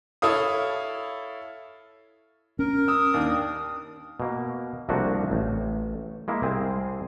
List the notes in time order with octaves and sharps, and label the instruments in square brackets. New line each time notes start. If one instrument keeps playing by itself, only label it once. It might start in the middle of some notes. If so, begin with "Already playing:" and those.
[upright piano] E4 A4 C#5 F5 D#6
[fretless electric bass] C#4 [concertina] A#4
[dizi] D#6 [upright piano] E6
[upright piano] D#2 D4
[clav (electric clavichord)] B2 A#3
C2 F3 A3 A#3 D4 F#4
A1
G#3 A#3 E4
C2 C4 G#4